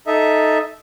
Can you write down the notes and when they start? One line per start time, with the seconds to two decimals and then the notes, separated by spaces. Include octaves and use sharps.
0.07 D#4 A4 D#5 E5